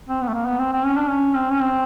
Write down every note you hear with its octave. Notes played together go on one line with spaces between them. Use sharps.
C4
B3
A3
A#3
B3
C4
C4
C#4
D4
C#4
C4
C#4
C4